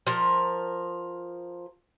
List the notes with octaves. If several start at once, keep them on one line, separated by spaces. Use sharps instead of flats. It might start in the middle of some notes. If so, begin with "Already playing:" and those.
F3 A#4